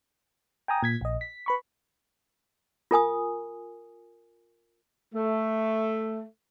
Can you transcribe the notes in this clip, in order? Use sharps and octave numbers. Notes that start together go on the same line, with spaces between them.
G5 G#5 A#5 D#6
A#2 G#6 B6
A#1 D#5
B6
B4 B5 C#6
F4 A#4 G#5 D#6
A3